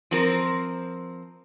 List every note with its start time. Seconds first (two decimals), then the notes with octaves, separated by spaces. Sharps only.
0.11 F3 C4 A#4